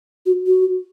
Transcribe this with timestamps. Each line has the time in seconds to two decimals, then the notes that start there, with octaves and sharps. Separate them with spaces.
0.26 F#4
0.46 F#4